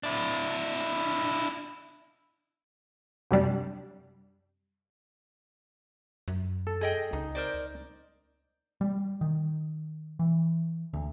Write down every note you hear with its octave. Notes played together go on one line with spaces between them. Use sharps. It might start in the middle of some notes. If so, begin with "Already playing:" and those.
D4 E4
F#2 C3 G3 D4
F#2
A4
G#4 D#5 G5
C#2 D#4
A#4 C5 D5
G3
D#3
E3
D2